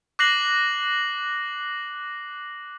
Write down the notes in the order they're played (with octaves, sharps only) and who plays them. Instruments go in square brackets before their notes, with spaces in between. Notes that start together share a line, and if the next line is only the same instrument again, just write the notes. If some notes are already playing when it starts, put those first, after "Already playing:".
[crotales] D6 F#6 A#6 C7 F#7